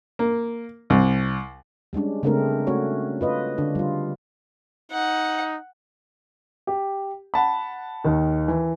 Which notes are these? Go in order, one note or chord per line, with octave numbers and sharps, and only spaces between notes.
A#3
C2
G3 G#3 C#4 D4
C#3 G#3 A3 C4 D4 A#4
A3 C#4 F#4 C#5
F4 B4 D#5
D3 D4
G3 F4
D#4 F#5
G4
F#5 A5 B5
D#2 D#3
E3